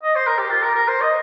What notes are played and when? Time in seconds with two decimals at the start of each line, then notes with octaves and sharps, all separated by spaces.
0.03 D#5
0.16 C5
0.27 A#4
0.38 G4
0.50 F4
0.63 A#4
0.75 A#4
0.88 C5
1.01 D#5